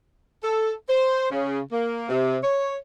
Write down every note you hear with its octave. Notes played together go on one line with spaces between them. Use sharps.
A4
C5
C#3
A#3
C3
C#5